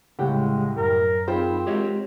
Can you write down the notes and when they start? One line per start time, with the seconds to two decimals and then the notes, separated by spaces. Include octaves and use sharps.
0.19 C2 A2 C#3 G#3 G4 F#5 G5
0.77 F#2 A#4
1.28 C4 D#4 F4 G#4 C5 G5 B5
1.66 G#3 F#4 G4 C#5 D#5